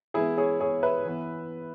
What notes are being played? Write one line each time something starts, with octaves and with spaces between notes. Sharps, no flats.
E3 G#3 B3 E4 G#4
G#4 C#5
G#4 C#5
B4 E5
E3 B3